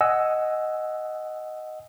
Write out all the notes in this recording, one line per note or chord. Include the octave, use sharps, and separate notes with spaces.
D#5 F#5 G#5 E6